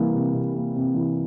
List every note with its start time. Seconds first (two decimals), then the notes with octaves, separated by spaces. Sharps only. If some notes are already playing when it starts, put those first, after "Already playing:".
Already playing: C3 E3 G3 A#3
0.14 C3
0.34 C3
0.55 A#3
0.75 C3
0.94 E3